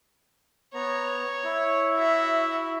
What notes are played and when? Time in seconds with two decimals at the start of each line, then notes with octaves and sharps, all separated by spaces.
0.74 B3 C#5 A#5
1.44 E4
1.96 F#4 E5